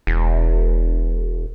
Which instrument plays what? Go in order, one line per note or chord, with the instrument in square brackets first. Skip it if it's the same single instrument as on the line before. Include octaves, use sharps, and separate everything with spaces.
[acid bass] E1